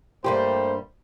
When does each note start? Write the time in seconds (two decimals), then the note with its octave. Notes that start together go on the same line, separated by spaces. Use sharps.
0.24 G2 G3 A3 A#3 G4 C5